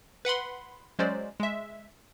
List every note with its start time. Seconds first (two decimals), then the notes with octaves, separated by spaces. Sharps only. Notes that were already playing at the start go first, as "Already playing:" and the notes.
0.25 B4 F#5 B5 C6
0.99 F#3 G#3 C#4 C5 D5
1.40 G#3 E5